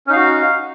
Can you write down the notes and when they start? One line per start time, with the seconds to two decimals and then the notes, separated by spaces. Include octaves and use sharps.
0.07 C#4
0.10 D#4
0.13 F5
0.16 F#4